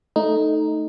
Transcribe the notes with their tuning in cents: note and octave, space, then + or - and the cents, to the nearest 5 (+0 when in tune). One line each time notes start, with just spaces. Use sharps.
A3 +0 D#4 +0